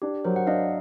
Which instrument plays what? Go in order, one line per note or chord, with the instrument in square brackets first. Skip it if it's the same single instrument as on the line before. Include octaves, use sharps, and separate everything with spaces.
[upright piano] D4 [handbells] G4
[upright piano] F#3 [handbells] A#4 C5
[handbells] F#5
[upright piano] D4 [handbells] D#5 F5